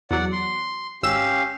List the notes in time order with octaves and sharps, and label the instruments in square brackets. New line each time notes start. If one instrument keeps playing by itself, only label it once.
[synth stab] E2 F#3 [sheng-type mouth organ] D5 F#5
[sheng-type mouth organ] C6
[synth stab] G#1 E6 E7 [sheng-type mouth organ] C#4 G4 F5